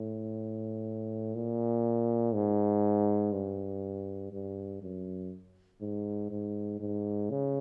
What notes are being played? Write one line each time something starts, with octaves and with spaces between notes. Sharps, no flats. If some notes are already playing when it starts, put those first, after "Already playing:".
Already playing: A2
A#2
G#2
G2
G2
F#2
G#2
G#2
G#2
C#3